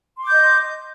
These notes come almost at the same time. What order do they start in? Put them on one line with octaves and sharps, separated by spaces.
C6 D6 G6 D#5